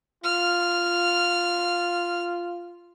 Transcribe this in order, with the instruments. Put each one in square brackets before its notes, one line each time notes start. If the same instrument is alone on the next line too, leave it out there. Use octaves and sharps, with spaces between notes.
[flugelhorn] F4 [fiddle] F6